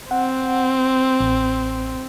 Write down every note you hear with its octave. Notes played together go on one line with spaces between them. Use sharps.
C4 F#5
A1